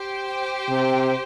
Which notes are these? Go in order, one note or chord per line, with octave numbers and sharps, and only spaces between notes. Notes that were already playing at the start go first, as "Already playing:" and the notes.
Already playing: G4 C5 G5
C3